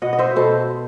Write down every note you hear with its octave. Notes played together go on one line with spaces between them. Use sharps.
B2 D#5 F#5
D#5
C5 E5
B2 A4 C5